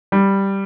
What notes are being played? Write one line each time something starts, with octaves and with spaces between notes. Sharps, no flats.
G3